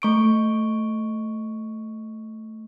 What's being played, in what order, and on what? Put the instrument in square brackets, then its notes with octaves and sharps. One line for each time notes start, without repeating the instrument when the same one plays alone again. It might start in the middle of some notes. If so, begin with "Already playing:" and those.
[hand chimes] A3 C#6 D7